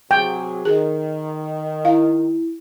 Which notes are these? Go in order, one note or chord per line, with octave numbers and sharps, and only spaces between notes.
C3 F#3 G#4 G5
D#3 G#4
E4 F5